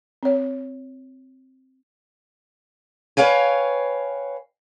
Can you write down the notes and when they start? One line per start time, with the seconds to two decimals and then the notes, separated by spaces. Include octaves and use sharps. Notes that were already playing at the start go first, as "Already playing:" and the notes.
0.23 C4 C#5
3.17 B4 C#5 F5 G5 G#5